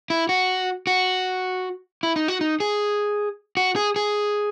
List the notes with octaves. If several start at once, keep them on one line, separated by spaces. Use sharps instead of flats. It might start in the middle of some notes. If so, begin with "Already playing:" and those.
E4
F#4
F#4
E4
D#4
F#4
D#4
G#4
F#4
G#4
G#4